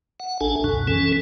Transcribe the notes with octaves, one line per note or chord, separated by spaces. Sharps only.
F#5
A1 D4 A4 G#5
C#2 F#2 B2
E3 C#4 A4